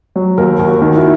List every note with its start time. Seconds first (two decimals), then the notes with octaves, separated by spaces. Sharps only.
0.16 F#3
0.38 D#2 A#4
0.59 D#2
0.67 F#4
0.82 D#3
0.97 E4